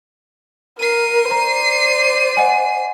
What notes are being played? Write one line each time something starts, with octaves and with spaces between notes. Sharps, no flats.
A#4 C7 D#7
C5 D5 A#5
D#5 F#5 G#5